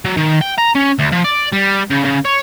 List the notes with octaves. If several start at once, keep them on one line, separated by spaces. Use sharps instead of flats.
F#3
D#3
G5
A#5
C#4
D2
F3
D5
G3
C#3
C#3
C#5